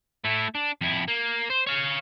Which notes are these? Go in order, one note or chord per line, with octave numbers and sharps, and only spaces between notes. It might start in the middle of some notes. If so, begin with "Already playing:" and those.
A3 E4
D4
F2 E4
A#3
C5
C#5 F5